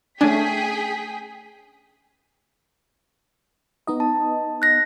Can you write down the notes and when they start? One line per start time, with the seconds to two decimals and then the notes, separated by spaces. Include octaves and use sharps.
0.21 A3 C#4 D4 G#4 G5 G#5 B6
3.87 B3 D#4 D#5
4.00 A5
4.62 F#6 A#6